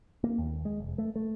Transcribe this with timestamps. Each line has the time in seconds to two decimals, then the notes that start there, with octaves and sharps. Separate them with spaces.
0.24 A#3
0.38 D#2
0.65 G#3
0.80 F1
0.98 A3
1.16 A3